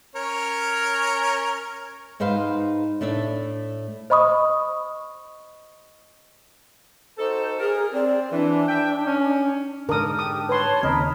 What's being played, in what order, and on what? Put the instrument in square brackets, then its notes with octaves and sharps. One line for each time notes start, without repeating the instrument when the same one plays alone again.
[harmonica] C#4 A#4 C#5
[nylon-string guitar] G#2 D#4 B4 C5 F5
A2 A3 D4 E5
[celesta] C5 D#5 B5 C#6 D#6
[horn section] D#4 F#4 A4 [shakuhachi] C5
[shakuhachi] G#4 [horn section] A#4
[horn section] C4 [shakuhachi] D5
[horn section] E3 [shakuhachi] D4
[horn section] E5 G5
C#4
[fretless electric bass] G#2 D3 [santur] D4 [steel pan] A#4 D#6
[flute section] G4 [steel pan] D#6
[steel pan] B4 C6 [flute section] C#5 A5
[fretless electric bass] D#2 C#3 C4 [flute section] D#4 B5 [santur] A#4